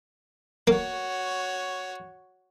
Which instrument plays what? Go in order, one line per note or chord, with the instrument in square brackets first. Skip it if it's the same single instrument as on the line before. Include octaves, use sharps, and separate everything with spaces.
[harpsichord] A#3 [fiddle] F#4 C#5